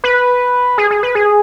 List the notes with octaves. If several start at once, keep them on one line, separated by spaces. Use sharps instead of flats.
B4
G#4
G#4
B4
G#4